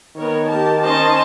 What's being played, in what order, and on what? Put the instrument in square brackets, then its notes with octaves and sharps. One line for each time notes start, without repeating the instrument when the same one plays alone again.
[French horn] D#3 [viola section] B3 A#4 C#5
[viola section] G4 A#4 A5
[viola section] C#4 C5 D#5 [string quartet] A5 C6